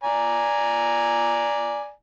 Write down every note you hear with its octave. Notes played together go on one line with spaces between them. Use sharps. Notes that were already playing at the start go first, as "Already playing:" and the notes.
D5 G#5 A#5